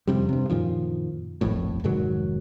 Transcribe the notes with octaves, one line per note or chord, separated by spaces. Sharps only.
F2 C3 G3
G2 C3
F#2 A#2 D#3 F3
D#1 G#1 F2 A2
F1 G#2 D#3 F#3